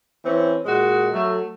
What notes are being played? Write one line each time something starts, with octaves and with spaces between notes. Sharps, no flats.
E3 C4 C#4
A#2 G#3 F#4
F#3 A3